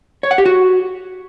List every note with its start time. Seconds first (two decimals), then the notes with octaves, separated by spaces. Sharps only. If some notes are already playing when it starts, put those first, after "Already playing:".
0.23 C#5
0.31 F#5
0.38 G4
0.46 F#4